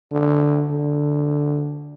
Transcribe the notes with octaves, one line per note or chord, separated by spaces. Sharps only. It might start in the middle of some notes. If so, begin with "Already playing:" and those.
D3
D3